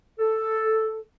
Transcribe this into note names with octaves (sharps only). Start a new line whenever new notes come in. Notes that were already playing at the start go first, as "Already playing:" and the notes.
A4